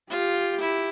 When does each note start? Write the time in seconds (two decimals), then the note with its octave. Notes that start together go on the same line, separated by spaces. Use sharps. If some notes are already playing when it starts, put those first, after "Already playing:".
0.10 F4 G4
0.60 E4